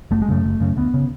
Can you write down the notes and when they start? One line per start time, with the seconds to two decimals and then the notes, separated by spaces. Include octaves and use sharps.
0.11 F#1 A3
0.22 G#3
0.29 F#2 C#3 A3
0.44 F#1
0.60 F#2 C#3
0.77 D2 B3
0.94 C#3